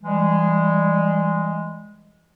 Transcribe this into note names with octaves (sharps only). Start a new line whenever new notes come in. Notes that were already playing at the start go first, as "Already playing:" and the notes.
E3 G3 G#3